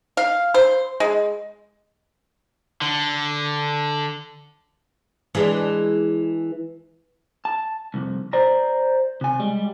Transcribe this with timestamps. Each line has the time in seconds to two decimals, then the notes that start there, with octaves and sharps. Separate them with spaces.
0.17 F5
0.54 C5
1.00 G#3
2.81 D3
5.35 E3 G#3 D4
7.45 A5
7.94 C2 F2
8.33 C5 D5 A#5
9.21 C3 G#5
9.40 G3 G#3